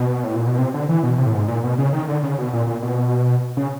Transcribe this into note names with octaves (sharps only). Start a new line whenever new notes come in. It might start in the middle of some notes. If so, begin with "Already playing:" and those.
Already playing: B2
A2
A#2
B2
C3
D3
E3
B2
C3
A2
G#2
A#2
B2
C#3
D#3
D3
C#3
B2
A#2
A#2
B2
C#3